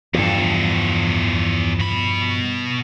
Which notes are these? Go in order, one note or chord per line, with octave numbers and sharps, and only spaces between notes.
E2 G2 F3 A4
B2 B5